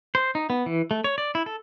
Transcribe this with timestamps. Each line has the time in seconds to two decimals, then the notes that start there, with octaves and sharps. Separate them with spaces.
0.15 C5
0.35 D#4
0.50 B3
0.66 E3
0.91 A3
1.04 C#5
1.18 D5
1.35 E4
1.46 A4